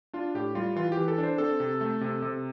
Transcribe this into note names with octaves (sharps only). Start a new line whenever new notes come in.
D4 F4
A2 G4
G3 F4
E3 F4
G4
E3
A4
D4
C5
C4 A4
C3
A3
C3
C3